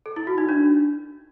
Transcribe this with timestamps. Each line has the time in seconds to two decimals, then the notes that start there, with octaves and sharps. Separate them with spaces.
0.06 A4
0.16 E4
0.27 F#4
0.38 D#4
0.49 D4